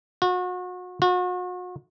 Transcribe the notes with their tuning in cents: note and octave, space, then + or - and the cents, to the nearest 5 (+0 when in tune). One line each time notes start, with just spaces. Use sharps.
F#4 -35
F#4 -40